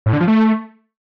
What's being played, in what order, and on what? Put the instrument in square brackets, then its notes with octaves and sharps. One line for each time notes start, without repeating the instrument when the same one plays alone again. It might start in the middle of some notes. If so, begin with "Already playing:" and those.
[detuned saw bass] A2
D3
F3
A3